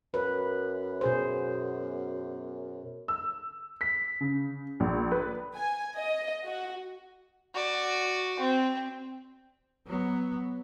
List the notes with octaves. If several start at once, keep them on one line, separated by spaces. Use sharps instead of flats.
F#2 B4
B2 G#4 C5
E6
B6
C#3
A#1
B4
G#5
D#5
F#4
F#4 D5
C4
F#3 B3